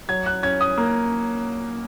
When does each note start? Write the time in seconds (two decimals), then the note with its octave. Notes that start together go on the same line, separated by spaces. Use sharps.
0.09 F#3 G#6
0.26 F#6
0.43 C#4 G#6
0.61 D#6
0.78 A#3